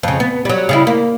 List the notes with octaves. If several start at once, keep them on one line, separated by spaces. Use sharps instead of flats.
F2 C#3
B3
F#3 G3
C#3 G3 E4
A#3